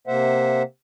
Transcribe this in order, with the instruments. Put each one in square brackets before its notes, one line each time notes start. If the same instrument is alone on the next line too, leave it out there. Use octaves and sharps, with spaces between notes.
[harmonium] C3 A#3 C5 E5 F#5